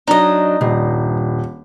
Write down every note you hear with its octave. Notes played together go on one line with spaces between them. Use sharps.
F#3 D4 D#4 D#5
D#1 G2